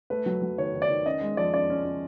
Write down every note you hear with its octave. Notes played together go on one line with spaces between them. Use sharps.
A3 B4
F#3
F#3
D#3 C#5
D#3
D5
D#3
C#4 D#5
G#3
F3 D5
C#4 D5
C#4
C#4